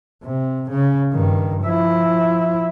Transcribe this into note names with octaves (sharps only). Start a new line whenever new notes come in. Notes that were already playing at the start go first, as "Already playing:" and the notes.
C3
C#3
G2 D#3
F3 E4